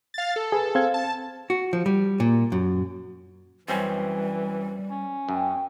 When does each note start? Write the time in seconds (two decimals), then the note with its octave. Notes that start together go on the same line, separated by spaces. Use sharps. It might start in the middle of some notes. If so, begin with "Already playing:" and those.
0.14 F5 A6
0.36 A4
0.52 G#4 B4
0.75 C4 F5 G#6
0.94 A5
1.50 F#4
1.73 F3
1.86 G3
2.20 A#2
2.52 F#2
3.68 F#2 E3 G3 C4 C#4
4.91 C#4
5.29 F#2 G5